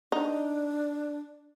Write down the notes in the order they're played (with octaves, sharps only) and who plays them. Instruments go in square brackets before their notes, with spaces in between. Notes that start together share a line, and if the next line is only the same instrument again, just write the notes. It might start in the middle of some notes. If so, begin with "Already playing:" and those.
[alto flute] D4 [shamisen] D#4